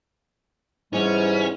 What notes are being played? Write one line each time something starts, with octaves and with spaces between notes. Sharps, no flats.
G#2 C3 E3 G3 C#4